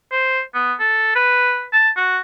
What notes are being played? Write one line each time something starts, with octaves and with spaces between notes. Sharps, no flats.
C5
B3
A4
B4
A5
F#4